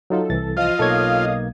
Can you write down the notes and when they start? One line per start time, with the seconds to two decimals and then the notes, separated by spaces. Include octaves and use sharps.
0.10 F#3 D#4 F4 A4
0.30 C2 E3 A6
0.57 F3 F4 D#5 F5 D#6
0.79 B1 A#3 A4 C#5 G#6